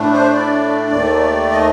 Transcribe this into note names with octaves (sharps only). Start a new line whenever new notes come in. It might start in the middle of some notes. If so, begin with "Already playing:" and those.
Already playing: A2 A3 D4
C5
D5
D#2 D#3 A3
D#5